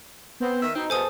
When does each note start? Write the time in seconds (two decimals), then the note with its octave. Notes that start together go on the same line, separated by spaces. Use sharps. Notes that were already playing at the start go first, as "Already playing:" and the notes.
0.40 B3 C4
0.62 D#3 E5
0.75 B2 C4 D#4
0.90 E2 B2 A4 C5 G#5 D#6